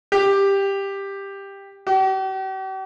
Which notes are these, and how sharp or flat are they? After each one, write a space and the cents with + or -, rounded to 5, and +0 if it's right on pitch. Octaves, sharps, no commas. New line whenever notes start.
G4 +10
G4 -45